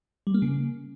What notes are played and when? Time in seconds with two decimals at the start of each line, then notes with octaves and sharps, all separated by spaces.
0.27 G3
0.34 A#3
0.42 C#3